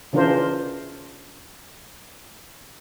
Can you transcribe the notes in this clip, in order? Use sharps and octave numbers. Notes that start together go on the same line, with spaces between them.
C#3 E3 D4 F4 A#4 C5